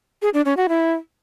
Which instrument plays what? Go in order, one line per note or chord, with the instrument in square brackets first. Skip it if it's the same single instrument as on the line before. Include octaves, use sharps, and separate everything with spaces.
[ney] G#4
D4
C#4
F#4
E4